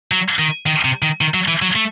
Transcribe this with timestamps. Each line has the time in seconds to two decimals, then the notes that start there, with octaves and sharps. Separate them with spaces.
0.11 F#3
0.39 D#3
0.66 D#3
0.85 C3
1.02 D#3
1.21 D#3
1.34 F#3
1.48 E3
1.62 F#3
1.76 A3